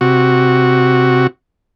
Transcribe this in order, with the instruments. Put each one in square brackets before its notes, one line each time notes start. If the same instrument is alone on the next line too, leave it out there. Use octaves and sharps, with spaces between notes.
[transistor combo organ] C3 F#4